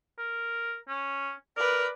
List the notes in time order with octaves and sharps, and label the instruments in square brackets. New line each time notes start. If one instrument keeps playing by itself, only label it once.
[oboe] A#4
C#4
[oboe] A#4 [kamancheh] B4 D5